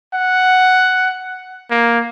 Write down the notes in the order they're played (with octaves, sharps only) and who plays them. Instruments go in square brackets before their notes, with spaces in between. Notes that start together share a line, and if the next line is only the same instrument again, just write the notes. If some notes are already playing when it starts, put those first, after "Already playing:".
[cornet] F#5
A#3